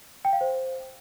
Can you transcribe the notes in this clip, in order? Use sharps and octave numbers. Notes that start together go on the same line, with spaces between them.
G5
F5
C5